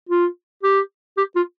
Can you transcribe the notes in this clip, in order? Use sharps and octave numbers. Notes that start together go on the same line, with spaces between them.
F4
G4
G4
F4